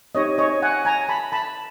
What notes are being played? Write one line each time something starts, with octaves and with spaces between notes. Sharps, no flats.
C4 D#4 G4 C#5 D#5
C#5 D#5
F#5 G#5
G#5 A#5
A5 B5
A5 B5